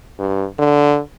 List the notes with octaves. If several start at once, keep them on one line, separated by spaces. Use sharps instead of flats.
G2
D3